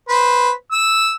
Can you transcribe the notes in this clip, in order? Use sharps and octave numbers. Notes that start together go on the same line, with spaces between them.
B4 C5
E6